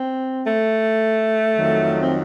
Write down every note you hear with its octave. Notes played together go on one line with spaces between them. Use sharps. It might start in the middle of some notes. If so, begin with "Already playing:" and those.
Already playing: C4
A3
F2 D#3 F#3
C4